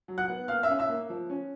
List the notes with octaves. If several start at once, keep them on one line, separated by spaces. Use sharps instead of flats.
F#3
F#5 F#6
B3
A#3 F5 F6
E5 E6
C#4
E5 E6
A#3
F3
C#4